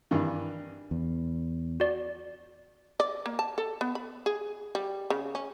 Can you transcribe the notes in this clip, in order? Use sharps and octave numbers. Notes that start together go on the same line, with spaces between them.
G2 D#3 E3
E2
F#4 D5
D5
A#3
A5
A4
B3
B5
G#4
G3
C#3
C#4